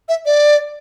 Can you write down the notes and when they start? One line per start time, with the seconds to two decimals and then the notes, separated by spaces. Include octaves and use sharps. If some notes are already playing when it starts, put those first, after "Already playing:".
0.09 E5
0.26 D5